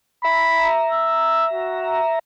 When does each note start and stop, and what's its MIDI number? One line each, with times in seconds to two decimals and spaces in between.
0.25 2.19 76
0.25 2.19 82
0.25 0.71 83
0.92 1.46 88
1.53 2.03 66